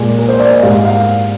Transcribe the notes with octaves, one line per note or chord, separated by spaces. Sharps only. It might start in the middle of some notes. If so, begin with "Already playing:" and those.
Already playing: A#2 G#3
A#4
C5
D5
D#5
G#2 G3 F5
F5